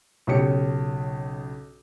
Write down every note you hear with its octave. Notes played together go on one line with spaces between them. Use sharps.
B1 C#3 C#4 G4 C#7